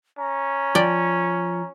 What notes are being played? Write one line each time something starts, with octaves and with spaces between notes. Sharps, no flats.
C#4 A#5
F3 D5 G5